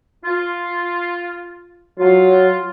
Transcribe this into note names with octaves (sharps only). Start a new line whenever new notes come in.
F4
F#3 F4